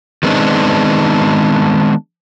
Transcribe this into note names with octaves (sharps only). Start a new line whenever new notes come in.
D#3 G#3 B3 C4 D4 D#4